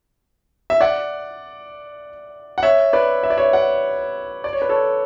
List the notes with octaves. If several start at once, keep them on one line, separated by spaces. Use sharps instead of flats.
E5
D5 F#5
F#5
C#5 E5
B4 D5
E5
D5
C#5 E5
D5 F#5
D5
C#5
B4
A4 C#5